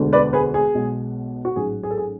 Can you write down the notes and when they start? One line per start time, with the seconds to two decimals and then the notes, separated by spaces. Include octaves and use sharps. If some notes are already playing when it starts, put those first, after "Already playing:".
Already playing: E1 D2 D3 G#3
0.13 B4 D5
0.33 G#4 B4
0.54 G#4
0.75 B1 B2 G#3
1.45 F#4
1.56 A1 G#2 F#3 G#4
1.83 G#4
1.91 A4
1.98 G#4